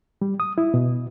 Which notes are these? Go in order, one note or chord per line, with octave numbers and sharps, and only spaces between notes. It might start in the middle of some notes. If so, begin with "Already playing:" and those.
G3
D#6
E4
B2